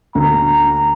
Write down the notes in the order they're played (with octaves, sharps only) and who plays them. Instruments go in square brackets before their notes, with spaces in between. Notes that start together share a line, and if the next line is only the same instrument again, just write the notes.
[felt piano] D2 [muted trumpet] A#5